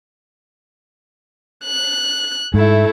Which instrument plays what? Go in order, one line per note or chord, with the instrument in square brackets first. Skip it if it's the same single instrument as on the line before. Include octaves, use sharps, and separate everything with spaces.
[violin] F#6
[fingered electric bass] G#2 [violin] A3 E4